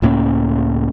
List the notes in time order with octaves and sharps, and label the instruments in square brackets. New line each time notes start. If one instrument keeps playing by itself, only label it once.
[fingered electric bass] C#2 A2 A#3 C#4